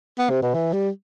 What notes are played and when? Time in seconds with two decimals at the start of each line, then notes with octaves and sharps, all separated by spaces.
0.19 B3
0.30 C3
0.42 B2
0.54 E3
0.73 G3